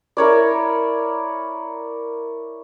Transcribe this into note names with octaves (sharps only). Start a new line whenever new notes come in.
E4 A#4 C#5 D5